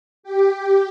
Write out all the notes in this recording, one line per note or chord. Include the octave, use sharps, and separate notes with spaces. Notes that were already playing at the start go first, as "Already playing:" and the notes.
G4